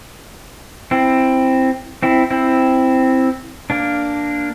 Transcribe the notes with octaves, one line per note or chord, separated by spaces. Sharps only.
C4 E4
C4 E4
C4 E4
A#3 D4